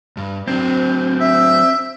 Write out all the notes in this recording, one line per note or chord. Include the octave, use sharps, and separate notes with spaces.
G2
F#3 C4 D4
E5